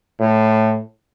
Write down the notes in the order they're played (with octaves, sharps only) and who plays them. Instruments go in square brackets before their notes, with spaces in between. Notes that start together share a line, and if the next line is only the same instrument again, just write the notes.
[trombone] A2